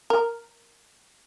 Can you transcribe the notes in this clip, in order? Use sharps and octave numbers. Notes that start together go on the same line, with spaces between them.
A#4